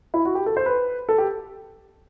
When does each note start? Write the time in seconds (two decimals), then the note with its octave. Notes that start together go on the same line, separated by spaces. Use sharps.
0.14 E4
0.25 F#4
0.35 G4
0.46 A4
0.57 C5
0.66 B4
1.09 A4
1.18 G4